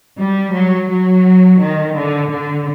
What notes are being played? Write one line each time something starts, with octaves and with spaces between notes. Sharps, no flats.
G3
F#3
F#3
D#3
D3
D3